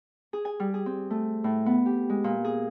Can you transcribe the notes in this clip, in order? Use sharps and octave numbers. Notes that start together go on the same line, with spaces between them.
G#4
G#5
G3
G#4
C4
A3
A2
B3
G4
G#3
A#2
G#4